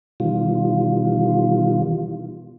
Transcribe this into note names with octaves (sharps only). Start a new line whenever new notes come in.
B2 D#3 E3 G3 F4